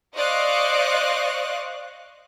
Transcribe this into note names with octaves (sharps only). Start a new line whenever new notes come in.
C5 D5 D#5 F5 C#6 F#6